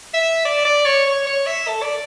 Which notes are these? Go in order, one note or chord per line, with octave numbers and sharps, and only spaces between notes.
E5
D5
D5
C#5
C#5
C#5
E5
A4
D5